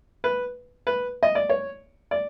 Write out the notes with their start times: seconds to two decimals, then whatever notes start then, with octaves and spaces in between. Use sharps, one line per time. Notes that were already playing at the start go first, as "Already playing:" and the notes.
0.24 B4
0.87 B4
1.23 D#5
1.35 D5
1.50 C#5
2.11 D5